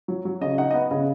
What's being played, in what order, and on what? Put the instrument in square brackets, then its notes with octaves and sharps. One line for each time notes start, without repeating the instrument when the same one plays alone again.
[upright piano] F#3
F#3
[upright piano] C#3 [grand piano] D#5
[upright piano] D#4 [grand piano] F#5
[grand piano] D#5
[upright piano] B3 [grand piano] F#5
[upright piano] C#3 [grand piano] D#5